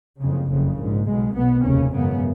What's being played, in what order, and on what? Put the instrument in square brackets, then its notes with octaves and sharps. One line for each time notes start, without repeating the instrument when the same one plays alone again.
[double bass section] F#1 F2 C#3
F#1 F2 C#3
A#1 G#2
B1 B2 G#3
B1 B2 B3
F1 D#2 C#3 C#4
G#1 F#2 C#3 B3